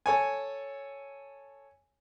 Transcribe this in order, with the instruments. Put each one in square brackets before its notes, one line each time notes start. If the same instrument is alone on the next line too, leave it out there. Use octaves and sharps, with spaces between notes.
[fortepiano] A4 C#5 G#5